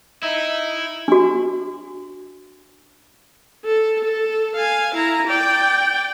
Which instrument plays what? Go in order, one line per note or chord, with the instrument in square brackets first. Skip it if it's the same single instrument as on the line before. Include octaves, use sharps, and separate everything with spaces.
[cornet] D#4 [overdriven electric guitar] E4 [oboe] E5
[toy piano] D4 F#4
[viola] A4
A4
F5 G#5
E4 A#5
D5 G5